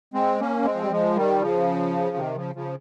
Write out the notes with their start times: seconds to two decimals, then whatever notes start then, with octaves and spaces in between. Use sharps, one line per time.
0.14 G#3 C4
0.40 A#3 C#4
0.64 G#3 C4
0.74 F3
0.82 G3
0.91 F3 G#3
1.16 D#3 G3
1.41 C#3 F3
2.16 C3 D#3
2.36 C#3 F3
2.55 C#3 F3